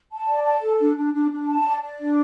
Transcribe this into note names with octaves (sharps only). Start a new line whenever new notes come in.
A5
D5
A5
A4
D4
D4
D4
D4
A5
D5
D5
D4